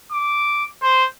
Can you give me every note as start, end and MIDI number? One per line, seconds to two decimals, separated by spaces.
0.12 0.65 86
0.82 1.06 72